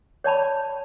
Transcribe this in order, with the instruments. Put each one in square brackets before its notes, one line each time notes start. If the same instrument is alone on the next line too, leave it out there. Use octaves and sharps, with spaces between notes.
[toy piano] C#5 D5 A5 B5